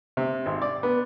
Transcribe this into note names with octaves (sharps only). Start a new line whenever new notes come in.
C3
G#1
D5
B3